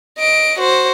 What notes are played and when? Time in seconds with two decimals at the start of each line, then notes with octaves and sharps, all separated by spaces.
0.18 D#5 D7
0.59 F#4 C5